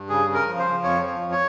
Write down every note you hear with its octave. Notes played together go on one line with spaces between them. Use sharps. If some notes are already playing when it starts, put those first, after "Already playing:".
Already playing: G2
C#3 G#4
C#3
A#4
F3
C5
F3
F2 C#5
F3
F2
C#5